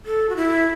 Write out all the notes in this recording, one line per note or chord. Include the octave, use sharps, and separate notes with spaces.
A4
F#4
E4